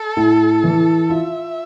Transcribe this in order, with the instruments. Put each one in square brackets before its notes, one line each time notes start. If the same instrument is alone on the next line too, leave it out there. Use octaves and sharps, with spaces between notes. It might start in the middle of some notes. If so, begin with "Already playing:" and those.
Already playing: [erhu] A4
[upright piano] A2
E3
[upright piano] F4 [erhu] E5